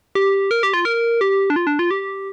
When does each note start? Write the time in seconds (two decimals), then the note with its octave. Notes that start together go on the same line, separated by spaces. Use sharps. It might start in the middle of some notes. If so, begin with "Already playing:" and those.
0.15 G4
0.51 A#4
0.63 G4
0.74 F4
0.85 A#4
1.21 G4
1.50 D4
1.56 F4
1.67 D4
1.79 F4
1.91 G4